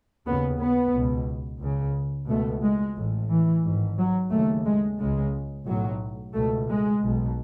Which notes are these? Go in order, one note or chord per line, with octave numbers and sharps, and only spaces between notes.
D#2 C#3 B3
B3
C#2 B2
C#2 C#3
C#2 B2 A3
G#3
A1 A2
E3
G#1 G#2
F#3
D#2 C#3 A3
G#3
C#2 C#3 G#3
B1 A2 F#3
C#2 B2 A3
G#3
B1 B2